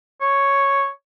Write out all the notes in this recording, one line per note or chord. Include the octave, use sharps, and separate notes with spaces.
C#5